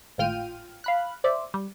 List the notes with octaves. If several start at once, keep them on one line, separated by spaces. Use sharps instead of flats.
G#1 A2 F4 G5 F6 D#7
F5 B5 F#6
C5 D5 E5
G3